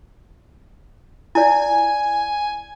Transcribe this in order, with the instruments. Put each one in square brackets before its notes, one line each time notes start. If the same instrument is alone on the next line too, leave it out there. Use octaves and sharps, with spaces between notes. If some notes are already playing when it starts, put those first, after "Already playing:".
[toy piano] E4 D5 [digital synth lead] G#5